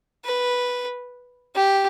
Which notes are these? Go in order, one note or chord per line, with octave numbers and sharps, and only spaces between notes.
B4
G4